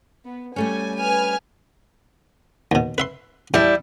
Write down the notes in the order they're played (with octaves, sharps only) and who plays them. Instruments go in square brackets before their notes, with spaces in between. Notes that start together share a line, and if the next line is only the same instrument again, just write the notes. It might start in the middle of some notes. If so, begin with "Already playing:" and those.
[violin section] B3
[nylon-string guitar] G3 A3 C#4 [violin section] G#5
[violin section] B4 G#5 F6
[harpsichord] D#2 B2
B4 E5 C6
[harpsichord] E2 [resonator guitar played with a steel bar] G3 E4